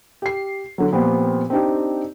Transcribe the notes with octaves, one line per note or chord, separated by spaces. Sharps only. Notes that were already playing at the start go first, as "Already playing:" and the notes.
G4 C7
D3 F#3
A#2 F3 B3 C4 G4
C4 D4 D#4 G4